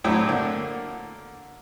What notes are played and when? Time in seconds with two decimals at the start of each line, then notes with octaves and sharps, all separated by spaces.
0.04 A2 F#3 C4 D4 E4
0.28 D3 A#3